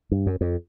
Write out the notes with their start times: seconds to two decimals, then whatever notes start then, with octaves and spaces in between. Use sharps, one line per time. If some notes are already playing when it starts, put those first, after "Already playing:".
0.12 G2
0.26 F#2
0.41 F2